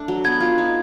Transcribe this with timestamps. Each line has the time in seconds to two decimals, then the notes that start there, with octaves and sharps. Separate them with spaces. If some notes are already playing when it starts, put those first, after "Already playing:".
Already playing: A3 D4
0.08 F#3
0.24 B3 G#6
0.40 F4
0.58 D#4